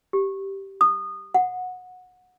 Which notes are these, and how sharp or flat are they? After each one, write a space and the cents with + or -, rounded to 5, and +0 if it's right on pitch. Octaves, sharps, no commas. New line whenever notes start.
G4 -5
D#6 -20
F#5 -20